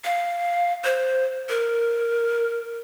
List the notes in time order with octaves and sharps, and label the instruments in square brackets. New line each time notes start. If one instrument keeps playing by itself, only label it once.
[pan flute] F5
C5
A#4